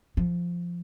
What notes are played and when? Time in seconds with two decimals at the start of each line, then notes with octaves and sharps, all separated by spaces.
0.17 F3